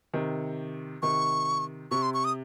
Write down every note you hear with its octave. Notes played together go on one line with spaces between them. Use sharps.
C3 D#3
C3 D#3 C#6
C3 C#6
C6
C#6
D#6